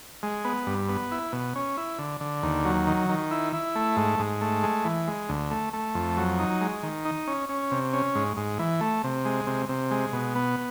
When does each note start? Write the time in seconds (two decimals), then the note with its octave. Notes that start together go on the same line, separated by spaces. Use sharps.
0.23 G#3
0.45 B3
0.67 G2
0.89 B3
1.11 E4
1.33 B2
1.56 C#4
1.77 E4
1.99 D3
2.21 D3
2.43 D#2
2.65 F#3
2.87 D#3
3.09 D#3
3.31 E4
3.53 E4
3.75 A3
3.97 G#2
4.19 G#2
4.41 A3
4.63 G#3
4.85 E3
5.07 G#3
5.29 D2
5.51 A3
5.73 A3
5.95 F2
6.17 F#3
6.39 D#4
6.61 G#3
6.83 D#3
7.05 D#4
7.27 C#4
7.49 C#4
7.71 C3
7.93 C#4
8.15 G#2
8.37 G#2
8.59 E3
8.81 A3
9.04 C3
9.25 G#3
9.47 C3
9.69 C3
9.91 G#3
10.13 B2
10.35 B3